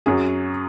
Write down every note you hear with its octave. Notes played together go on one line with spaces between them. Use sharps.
F#2 F#3 G#4